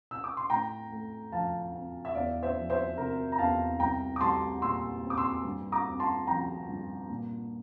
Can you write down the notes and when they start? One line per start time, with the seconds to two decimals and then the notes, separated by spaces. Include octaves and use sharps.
0.11 E6
0.24 D6
0.37 C6
0.50 A2 G5 A#5
0.91 A3
1.32 F3 F5 A5
1.74 C4
2.05 E5
2.15 E2 D5 F5
2.43 C5 E5
2.57 F3
2.70 C5 E5
2.97 C3 A#4
3.32 A#5
3.38 E2 F5 A5
3.80 C2 G5 A#5
4.16 D6
4.21 G3 A5 C6
4.62 A#2 C6 E6
5.03 C4
5.10 D6
5.17 C6 E6
5.45 G2
5.72 A#5 D6
5.86 C4
6.00 A5 C6
6.27 F3 G5 A#5
6.69 G2
7.10 A#2